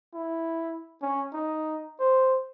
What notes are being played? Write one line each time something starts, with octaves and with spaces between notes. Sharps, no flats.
E4
C#4
D#4
C5